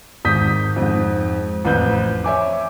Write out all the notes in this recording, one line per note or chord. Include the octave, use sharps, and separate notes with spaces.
G#1 D#6 G6 B6
F2 G#2
A1 F2 B4 G6
C#5 E5 G#5 D6